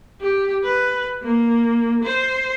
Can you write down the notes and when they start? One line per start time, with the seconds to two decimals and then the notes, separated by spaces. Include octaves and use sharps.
0.21 G4
0.64 B4
1.23 A#3
2.04 C5